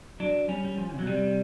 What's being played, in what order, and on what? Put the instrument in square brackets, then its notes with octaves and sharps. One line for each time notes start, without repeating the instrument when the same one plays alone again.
[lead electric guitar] F#3 [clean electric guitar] D4
[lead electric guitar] G3 [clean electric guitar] C#4
[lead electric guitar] G3
F3
[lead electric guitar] B2 [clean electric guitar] F#3
[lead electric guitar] C3 [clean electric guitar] G3